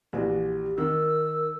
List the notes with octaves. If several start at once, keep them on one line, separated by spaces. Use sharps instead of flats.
A#1 E3 F#4 G4
D#3 A#4 E6